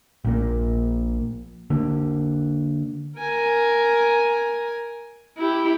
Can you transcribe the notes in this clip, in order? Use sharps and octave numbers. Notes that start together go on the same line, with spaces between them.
A#1 A#2 A#3
D3 A#3
A#4 G#5
E4 G4